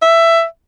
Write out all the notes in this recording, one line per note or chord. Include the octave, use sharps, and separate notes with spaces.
E5